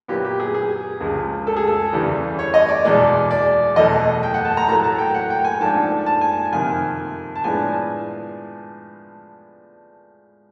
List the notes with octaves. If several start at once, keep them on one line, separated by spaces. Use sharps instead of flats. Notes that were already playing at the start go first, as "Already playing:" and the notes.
A#2 F#3 B3 E4 G4
G4
G#4
G#4
C#2 C#3 F3 G#3
A4
G#4
A4
E2 C#3 E3 G3
C#5
D#5
D5
E2 B2 G#3 D5
D5
E2 B2 F#3 A3 D#5
G5
F#5
A5
A#5
A2 F#3 A3 A#5
A5
G5
F#5
G5
G#5
G#2 F3 A3 D4 A5
A5
G#5
F2 C3 D#3 G#5
A5
A2 F3 G#3 B3 D4 G#5